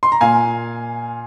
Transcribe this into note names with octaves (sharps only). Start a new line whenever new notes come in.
C6
A#5
A#2 F5 G#5